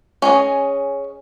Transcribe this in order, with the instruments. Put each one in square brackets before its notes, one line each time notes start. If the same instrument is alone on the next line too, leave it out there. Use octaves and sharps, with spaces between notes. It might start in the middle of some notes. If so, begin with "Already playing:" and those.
[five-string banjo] C#4 G#4 D#5